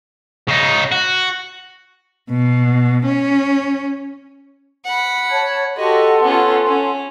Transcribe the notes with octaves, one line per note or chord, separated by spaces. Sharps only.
C#3 D#4
F#4
B2
C#4
F#5 B5
C#5 A5 G#6
F#4 G4 A4 D#5 F#5 C6
B3 C#4 F4
C#4